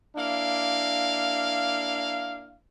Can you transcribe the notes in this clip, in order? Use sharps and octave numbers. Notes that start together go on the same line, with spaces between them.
A#3 D4 E4 F5